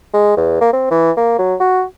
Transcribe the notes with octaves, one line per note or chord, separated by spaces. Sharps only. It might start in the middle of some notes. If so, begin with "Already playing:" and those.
G#3
E2
A#3
C4
E3
A#3
F#3
F#4